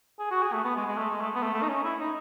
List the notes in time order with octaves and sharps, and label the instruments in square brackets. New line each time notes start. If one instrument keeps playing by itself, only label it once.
[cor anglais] G#4
F#4
G#4
A3
B3
G#3
G#3
A3
G#3
A3
B3
A3
A3
D#4
C#4
E4
D#4